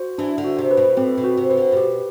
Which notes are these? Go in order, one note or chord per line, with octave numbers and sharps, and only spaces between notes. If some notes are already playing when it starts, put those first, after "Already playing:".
Already playing: F#4 C5
E3 D4
D3
F#4
C3
B4
B2
A2 C4
B2
F#4
C3
C3 B4
D3
A2
B2 G4